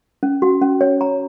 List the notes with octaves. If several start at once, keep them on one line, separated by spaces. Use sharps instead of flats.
C#4
F#4
C#4
C#5
A#5